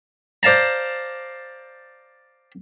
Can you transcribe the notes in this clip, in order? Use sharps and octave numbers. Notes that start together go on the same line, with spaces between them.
C5 D5 F5 A5 A#5